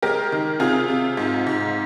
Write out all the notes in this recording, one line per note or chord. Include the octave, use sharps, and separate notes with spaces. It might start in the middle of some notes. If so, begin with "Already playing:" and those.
G#3 G4 A#4
D#3
C3 F4 G#4
C3
G#2
G#2